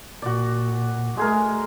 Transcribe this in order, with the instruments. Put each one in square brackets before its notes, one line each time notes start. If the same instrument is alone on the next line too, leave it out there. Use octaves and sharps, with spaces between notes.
[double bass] A#2 [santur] F#4 D5
[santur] G#3 G#4 A#4 [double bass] A3